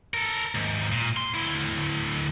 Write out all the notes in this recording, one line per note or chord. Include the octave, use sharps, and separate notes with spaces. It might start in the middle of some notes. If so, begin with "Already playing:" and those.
A4 A#4
D#2 G#2
A#2
C6
D2 E4